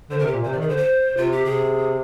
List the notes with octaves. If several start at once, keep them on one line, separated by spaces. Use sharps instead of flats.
D3 C5
A#4
C3
G4
A#2
C3 C5
D5
D#3
G#4
D3 C5
C5
C3
F4
G4
C3 G#4